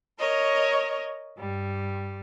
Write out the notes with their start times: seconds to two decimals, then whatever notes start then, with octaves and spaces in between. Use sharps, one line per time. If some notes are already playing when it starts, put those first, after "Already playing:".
0.19 A#4 C#5 D#5
1.38 G2 G3